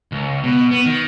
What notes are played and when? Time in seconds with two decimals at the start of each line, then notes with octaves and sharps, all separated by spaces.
0.12 C#2
0.44 B2
0.71 B3
0.86 D#3